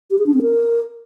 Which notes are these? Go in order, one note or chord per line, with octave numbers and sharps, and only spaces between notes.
G4
G#4
D4
C4
A#4